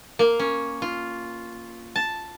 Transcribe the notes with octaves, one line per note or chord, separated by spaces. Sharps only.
A#3
C#4
F4
A5